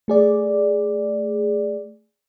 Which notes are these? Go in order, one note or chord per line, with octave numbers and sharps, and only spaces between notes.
A3 G#4 D5